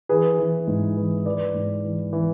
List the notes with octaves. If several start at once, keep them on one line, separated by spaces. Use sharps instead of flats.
E3 G#4 B4
E3
G#2
E3
E3 B4 D5
G#2
E3
E3